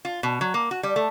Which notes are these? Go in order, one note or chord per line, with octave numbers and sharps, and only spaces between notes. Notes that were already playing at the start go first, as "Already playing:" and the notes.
F4
B2
F#3
A#3
F#4
G3
A3